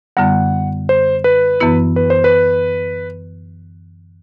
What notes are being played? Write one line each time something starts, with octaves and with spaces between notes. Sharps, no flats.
F#2 D3 G3 B3 E4 F#5
C5
B4
F#2 E3 B3 E4
B4
C5
B4